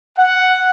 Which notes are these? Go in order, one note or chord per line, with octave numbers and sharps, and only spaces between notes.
F#5